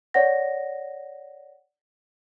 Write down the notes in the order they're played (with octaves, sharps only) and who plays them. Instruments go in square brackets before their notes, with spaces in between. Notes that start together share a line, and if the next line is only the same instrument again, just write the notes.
[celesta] C#5 D5 F#5 A#6